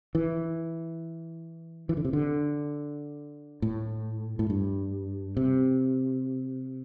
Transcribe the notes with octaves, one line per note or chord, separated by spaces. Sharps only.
E3
E3
D3
C3
D3
A2
A2
G2
C3